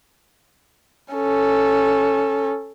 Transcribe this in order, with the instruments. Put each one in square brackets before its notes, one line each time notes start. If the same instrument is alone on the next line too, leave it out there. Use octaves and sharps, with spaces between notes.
[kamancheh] C#4 A4